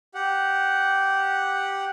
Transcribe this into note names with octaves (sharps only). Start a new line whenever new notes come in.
G4 F#5